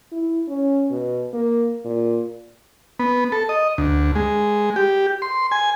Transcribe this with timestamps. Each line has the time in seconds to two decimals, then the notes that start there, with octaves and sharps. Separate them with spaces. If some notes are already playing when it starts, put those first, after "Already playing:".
0.12 E4
0.48 C#4
0.90 B2
1.33 A#3
1.85 A#2
3.00 B3
3.32 A4
3.49 D#5
3.78 D2
4.16 G#3
4.76 G4
5.22 C6
5.52 G#5